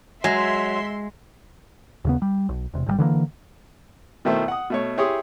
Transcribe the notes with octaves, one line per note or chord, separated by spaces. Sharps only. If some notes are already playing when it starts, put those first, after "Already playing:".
F#3 G#3 E5 C6
D#2 C#3 B3
G3
B1
E1 C3
G#1 D3 G3
D3 E3 G#3 A#3
B2 D#3 A3 E4 C5
F#5 D#6
B2 A3 C#5
E4 G4 G#4 C#5 C6 D#6